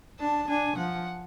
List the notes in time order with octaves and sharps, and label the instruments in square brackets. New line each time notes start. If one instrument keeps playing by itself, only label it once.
[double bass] D4 [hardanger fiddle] A5
[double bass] D4 [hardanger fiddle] G#5
[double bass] F3 [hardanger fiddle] F#5